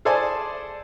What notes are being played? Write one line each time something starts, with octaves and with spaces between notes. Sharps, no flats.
G#4 A4 C5 D5 G#5 A5